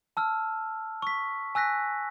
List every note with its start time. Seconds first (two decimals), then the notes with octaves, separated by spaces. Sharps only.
0.17 A5 E6 F6
1.02 C#6 B6
1.55 G#5 E6 F#6 A#6 B6